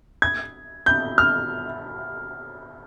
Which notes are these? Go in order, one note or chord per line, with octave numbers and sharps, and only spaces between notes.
G#6
G6
F6